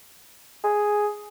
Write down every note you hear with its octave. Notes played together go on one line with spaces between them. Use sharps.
G#4